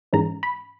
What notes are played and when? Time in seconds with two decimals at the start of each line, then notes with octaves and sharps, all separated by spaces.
0.13 G#2 E3 G#3 C#4 A#5
0.43 B5